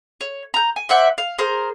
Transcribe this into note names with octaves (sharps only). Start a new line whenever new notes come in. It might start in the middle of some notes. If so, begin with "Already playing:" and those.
C#5
A#5 G6
G#5
C5 D5 E5 F#5
F5
G#4 A#4 C5 A#5